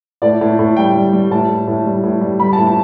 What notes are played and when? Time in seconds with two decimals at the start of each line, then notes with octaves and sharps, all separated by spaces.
0.22 A2 D5
0.41 A2
0.59 A2
0.76 G3 G5
0.95 G3
1.13 G3
1.31 A2 A5
1.48 A2
1.67 A2
1.85 G3
2.03 A2
2.21 G3
2.39 G3 B5
2.53 A5
2.58 A2
2.67 A5